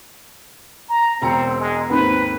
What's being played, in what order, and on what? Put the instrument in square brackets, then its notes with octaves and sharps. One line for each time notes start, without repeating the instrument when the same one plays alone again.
[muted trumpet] A#5
[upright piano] E1 A#5 C#7 [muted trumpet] C4
[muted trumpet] G#3
[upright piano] D#2 G#2 C4 [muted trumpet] B4